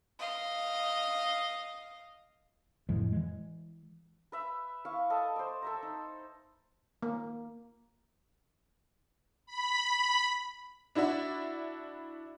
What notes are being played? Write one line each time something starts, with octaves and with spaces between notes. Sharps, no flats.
D#5 F5
F2 A2 F3 G#3
E3 G#3
B4 E5 B5
E4 F5 C#6
A4 D#5 E5 A5
C5 D5
A4 E5 A#5
D#4
A#3
B5
D4 E4 F#4 D5 E5